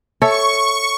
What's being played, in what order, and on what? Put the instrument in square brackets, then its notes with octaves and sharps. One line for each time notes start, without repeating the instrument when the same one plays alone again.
[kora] A4 C#5 E5 [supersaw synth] C#6